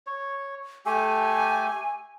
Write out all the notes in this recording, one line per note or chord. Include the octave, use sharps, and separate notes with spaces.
C#5
A3 G4 A4 G#5